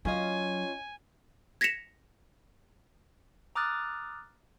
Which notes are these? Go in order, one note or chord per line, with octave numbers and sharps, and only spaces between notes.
F#3 C#4 F4 D#5 G#5
G#6 A#6 B6 C#7 E7 F7
A#5 D6 D#6 F6 F#6 A6